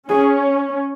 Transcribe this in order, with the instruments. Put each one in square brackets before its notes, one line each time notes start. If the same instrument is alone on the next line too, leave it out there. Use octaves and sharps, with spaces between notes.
[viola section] C#4 [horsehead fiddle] G#4